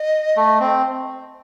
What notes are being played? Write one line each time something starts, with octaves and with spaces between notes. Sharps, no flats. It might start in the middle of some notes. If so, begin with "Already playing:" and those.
Already playing: D#5
A3
C4